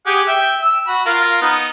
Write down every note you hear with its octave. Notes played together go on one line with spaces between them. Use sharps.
G4 G#4 F#5
E5 G5
E6
F#4 B5
F4 A#4 F5
B3 D#4